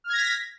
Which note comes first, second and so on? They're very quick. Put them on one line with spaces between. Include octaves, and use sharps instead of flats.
F6 G#6 A#6 B6